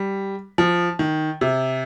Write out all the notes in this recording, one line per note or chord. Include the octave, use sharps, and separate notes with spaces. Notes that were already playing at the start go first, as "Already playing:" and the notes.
Already playing: G3
F3
D#3
C3